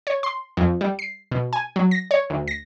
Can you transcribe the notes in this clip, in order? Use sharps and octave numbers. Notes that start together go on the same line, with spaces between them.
C#5
C6
F2
G3
C7
B2
G#5
F#3
A#6
C#5
D2
A#6